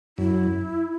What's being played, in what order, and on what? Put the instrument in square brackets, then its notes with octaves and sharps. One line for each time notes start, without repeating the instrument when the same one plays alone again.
[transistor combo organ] F#2 [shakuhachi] E4